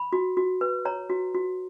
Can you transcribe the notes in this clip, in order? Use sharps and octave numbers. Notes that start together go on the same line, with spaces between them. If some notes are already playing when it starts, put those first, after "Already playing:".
Already playing: B5
F#4
F#4
B4
C#5 A#5
F#4
F#4